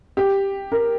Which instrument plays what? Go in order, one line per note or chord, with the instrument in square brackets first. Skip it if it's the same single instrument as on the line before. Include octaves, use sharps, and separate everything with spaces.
[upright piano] G4
A#4